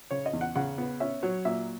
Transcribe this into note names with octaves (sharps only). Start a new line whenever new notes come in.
C#3 C#5
D#5
E2
F#5
C#3 F#5
B3
C#4 E5
F#3 C#5
A#2 E5